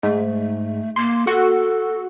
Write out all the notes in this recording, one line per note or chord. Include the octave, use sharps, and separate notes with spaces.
G#2 A3
A#3 C6
F#4 A4